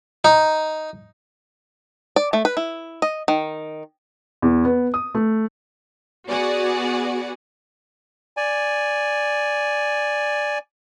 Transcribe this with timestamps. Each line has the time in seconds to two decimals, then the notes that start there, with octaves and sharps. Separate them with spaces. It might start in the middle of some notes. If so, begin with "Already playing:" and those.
0.25 D#4
2.16 D5
2.33 A3
2.45 B4
2.57 E4
3.02 D#5
3.28 D#3
4.42 E2
4.65 B3
4.94 D#6
5.15 A3
6.28 B3 F#4 G#4 D5 F#5
8.37 D5 G#5